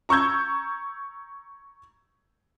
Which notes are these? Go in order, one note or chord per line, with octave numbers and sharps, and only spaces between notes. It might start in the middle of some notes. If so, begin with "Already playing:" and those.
A#5 C#6 E6 G6 G#6